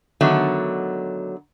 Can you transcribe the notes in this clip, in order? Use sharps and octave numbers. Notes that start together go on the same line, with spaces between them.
D3 D#3 F#3 A3 B3